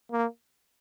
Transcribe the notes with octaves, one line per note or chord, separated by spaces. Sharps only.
A#3